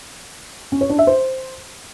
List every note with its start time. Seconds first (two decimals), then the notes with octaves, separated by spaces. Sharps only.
0.72 C#4
0.81 C#5
0.90 D4
0.98 E5
1.07 C5